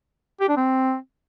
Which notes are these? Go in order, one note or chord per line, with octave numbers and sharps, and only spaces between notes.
G4
D4
C4